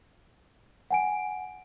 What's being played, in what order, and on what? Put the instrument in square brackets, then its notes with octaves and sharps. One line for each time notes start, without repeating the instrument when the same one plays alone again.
[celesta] F#5 G#5 D7